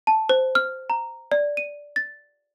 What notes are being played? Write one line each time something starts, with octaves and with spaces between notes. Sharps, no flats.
A5
C5
F6
A#5
D5
D#7
A6